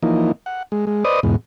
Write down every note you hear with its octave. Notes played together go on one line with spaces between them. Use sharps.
E3 F3 A#3 D#4
F#5
G#3
G#3
B4 C5 D5 D#5 D#6
E2 G#2 B2